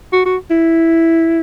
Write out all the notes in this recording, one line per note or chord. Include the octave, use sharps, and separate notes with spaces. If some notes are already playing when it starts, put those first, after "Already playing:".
F#4
F#4
E4